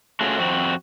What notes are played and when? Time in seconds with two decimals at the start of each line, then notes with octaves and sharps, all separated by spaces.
0.21 A3 C#4 F4 F#4 G#4
0.38 F2 C4 F#4